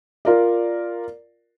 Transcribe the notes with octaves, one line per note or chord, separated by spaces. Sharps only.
F4 A#4 D5